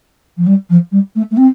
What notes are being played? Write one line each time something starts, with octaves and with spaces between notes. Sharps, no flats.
F3
G3
F3
G3
A3
A3
C4